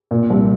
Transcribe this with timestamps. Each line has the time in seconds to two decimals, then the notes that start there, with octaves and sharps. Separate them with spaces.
0.11 A#2
0.30 C2